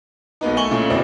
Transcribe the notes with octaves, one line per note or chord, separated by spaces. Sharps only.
B1 A#3 B3 D#4
A3 G#5 C#6 F#7 G7
A#2 C#3 A3
F#1 D2 B2 C4 E4 D5